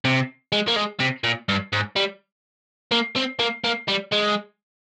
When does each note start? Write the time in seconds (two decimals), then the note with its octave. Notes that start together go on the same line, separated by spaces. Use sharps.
0.05 C3
0.52 G#3
0.68 A#3
0.76 G#3
1.00 C3
1.24 A#2
1.49 G2
1.73 G#2
1.96 G3
2.92 A#3
3.16 C4
3.39 A#3
3.64 A#3
3.88 G3
4.12 G#3